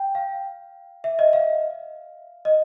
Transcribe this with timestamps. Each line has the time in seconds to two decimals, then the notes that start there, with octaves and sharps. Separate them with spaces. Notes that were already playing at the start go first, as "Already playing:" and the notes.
Already playing: G5
0.15 F5
1.04 E5
1.19 D#5
1.33 F5
2.45 D#5